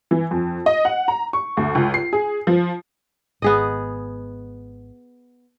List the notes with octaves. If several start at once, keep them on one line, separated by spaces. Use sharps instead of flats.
E3
F2
D#5
F#5
A#5
C#6
D2
C#2
C7
G#4
F3
G#1 B3 G#4 D#5